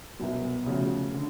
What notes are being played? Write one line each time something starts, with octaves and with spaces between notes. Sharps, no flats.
C2 B2 F#3
C#3 F3 A3 C#4 F#4
D3